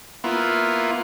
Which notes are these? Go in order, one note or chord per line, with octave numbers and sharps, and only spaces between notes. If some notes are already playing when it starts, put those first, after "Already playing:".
A#3 B3 E4 F4